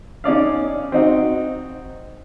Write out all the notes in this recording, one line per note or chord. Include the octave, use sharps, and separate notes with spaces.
C#4 D#4 D5 F5
C4 D#4 F#4